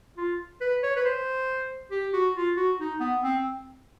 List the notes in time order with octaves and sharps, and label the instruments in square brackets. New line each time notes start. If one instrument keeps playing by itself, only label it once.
[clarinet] F4
B4
C#5
B4
C5
G4
F#4
F4
F#4
D#4
B3
C4